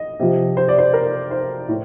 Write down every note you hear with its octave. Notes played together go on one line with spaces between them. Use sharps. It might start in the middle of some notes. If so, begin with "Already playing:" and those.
Already playing: D#5
C3 F3
C5
D5
C5
A#4
C5
A2